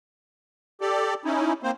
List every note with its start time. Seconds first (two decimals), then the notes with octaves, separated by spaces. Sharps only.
0.81 G4 A4 D5
1.25 C#4 D#4 E4
1.63 A#3 C4 C5